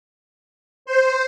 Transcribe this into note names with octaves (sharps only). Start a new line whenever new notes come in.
C5